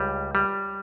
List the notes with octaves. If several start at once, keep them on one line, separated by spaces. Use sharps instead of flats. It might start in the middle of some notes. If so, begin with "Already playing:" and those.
Already playing: C#2 G3
G3